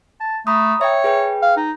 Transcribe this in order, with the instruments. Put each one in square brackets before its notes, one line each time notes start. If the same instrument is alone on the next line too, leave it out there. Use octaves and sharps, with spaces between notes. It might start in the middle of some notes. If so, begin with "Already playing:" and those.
[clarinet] A5
[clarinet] A3 [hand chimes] A#5 B5 D#6
[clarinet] C#5 [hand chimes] E5 G5
[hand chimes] G#4 B4 G5
[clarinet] F5
D#4